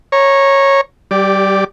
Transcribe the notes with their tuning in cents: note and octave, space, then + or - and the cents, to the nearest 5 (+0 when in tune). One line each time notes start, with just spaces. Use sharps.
C#5 -10 A#5 +5
G3 -25 G4 +15 D5 +0